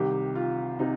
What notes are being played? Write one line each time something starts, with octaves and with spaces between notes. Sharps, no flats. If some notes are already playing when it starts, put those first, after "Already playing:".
Already playing: C2 C3 D#3 G4
F4
C3 D#4